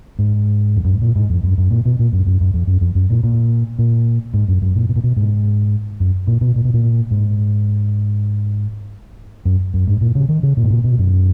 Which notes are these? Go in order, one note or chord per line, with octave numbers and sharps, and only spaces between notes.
G#2
F2
F#2
G#2
A#2
G#2
F2
F#2
F#2
A#2
B2
A#2
F#2
F#2
F#2
F2
F#2
F2
F#2
A#2
A#2
A#2
G#2
F#2
F#2
A#2
B2
A#2
B2
G#2
F#2
A#2
B2
A#2
B2
A#2
G#2
F#2
F#2
G#2
A#2
C#3
D#3
C#3
A#2
G#2
A#2
B2
F#2